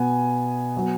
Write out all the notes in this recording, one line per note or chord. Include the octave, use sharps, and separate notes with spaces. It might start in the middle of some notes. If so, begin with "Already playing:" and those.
Already playing: B2 B3 G#5
F#3 B3